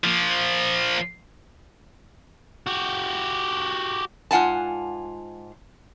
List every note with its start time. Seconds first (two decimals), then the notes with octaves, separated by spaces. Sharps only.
0.04 F3 A#3
2.67 F#4 G4
4.31 G#2 F4 F#5 G#5 A5